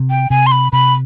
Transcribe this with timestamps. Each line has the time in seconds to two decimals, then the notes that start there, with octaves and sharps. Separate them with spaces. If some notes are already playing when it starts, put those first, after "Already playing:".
Already playing: C3
0.10 G5
0.30 C3 G#5
0.46 C6
0.52 B5
0.72 C3 B5